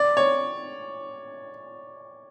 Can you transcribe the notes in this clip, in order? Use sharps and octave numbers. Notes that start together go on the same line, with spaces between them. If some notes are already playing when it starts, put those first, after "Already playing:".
Already playing: D5
C#5